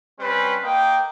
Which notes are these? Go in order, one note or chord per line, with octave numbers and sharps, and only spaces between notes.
G3 C4 C#4 B4 C5
A#3 D#5 G5